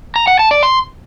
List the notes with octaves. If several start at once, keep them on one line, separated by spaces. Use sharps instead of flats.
A#5
F#5
A5
D5
C6